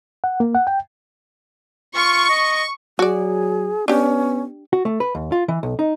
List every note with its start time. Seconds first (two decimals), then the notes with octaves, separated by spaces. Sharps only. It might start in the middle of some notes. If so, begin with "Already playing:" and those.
0.24 F#5
0.40 A#3
0.55 F#5
0.67 G5
1.95 F4 C#6
2.29 D#5
2.99 F#3 F#4 G#4 D5
3.88 B3 C#4 D4 G4
4.73 F#4
4.85 A3
5.00 B4
5.15 D#2
5.32 F4
5.48 E3
5.63 B1
5.79 D#4